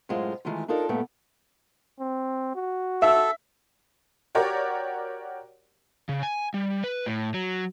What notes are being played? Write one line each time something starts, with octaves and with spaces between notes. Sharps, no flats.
F#2 A2 G#3 F4 C5
D#3 E3 G#3 A3 F4
D4 D#4 F4 A4 A#4 D5
G2 A#2 A3 B3
C4
F#4
A4 E5
F#4 G4 A#4 C#5 D5
C#3
G#5
G3
B4
A2
F#3